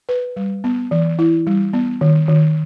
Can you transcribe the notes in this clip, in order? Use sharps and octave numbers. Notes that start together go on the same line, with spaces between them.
B4
G3
B3
E3
E4
G3
B3
D#3
D#3